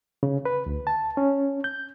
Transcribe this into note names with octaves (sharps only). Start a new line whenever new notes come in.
C#3
B4
D2
A5
C#4
G6